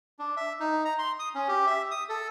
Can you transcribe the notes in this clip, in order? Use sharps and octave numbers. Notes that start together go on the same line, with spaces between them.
D4
E5
D#4
A#5
C6
D#6
C#4
G4
E5
D#6
A4